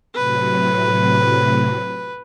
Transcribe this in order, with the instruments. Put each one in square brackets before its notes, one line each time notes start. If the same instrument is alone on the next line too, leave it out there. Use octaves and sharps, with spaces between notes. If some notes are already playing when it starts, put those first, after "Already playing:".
[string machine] A2 C3 F#3 [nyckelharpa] B4